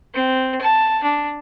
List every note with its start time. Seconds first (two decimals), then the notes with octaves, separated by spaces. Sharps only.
0.14 C4
0.61 A5
1.04 D4